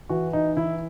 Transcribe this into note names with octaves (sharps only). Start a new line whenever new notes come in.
E3 F#4
D#4
E3 E4